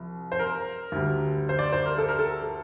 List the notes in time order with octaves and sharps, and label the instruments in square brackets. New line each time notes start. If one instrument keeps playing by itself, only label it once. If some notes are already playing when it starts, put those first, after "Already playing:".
Already playing: [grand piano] C2 F3
C5
A#4
D2 D3 G3
C5
D5
C5
A#4
A4
A#4
A4